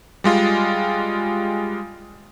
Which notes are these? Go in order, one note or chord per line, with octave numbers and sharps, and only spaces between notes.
G3 G#3 F4